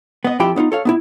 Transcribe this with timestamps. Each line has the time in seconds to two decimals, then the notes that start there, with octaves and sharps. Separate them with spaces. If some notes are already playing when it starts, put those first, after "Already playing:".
0.25 B3 D#5
0.40 F2 E4 F4 G4 G5 B5
0.56 B3 C#4 D#4 F4
0.72 A4 C#5 F5
0.85 B3 D4 E4